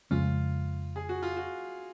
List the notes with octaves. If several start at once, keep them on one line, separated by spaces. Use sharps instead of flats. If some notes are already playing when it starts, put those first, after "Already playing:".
F2 C#3 G#3 C#4 F4
G#4
F#4
F4
F#4